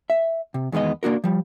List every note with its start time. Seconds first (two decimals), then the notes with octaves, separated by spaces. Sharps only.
0.10 E5
0.54 C3
0.72 E2 D#3 G#3 B3 D#5
1.03 A#3 D4 F#4 A#4
1.24 F3 G3